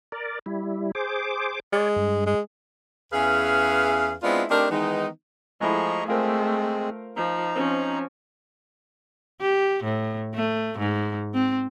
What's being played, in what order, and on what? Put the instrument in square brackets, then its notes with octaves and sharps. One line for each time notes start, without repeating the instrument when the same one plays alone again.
[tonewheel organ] A#4 D5
G3 E4
G#4 C5 D6
[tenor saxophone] G#3 [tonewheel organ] C#5 D5
[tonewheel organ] G2
[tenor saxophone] G#3
[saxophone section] E2 C#4 G#4 B4 E5 F5
G#3 B3 C4 D4 E4 F4
A3 C4 D4 D#4 G4 A#4
D#3 E3 G#3 B3 D#4
[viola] F3 G#4 [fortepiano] G#3 A3 E4 [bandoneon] D#5 A#5 C#6
[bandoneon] G#3 C4 G#4 [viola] A3 [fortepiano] F4 A#4 C5
[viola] F3 [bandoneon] D#4 A#5
[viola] F3 C#4 [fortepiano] C4
[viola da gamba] G4
A2
A3
G#2
C4